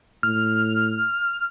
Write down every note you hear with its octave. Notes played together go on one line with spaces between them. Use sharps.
A2 F6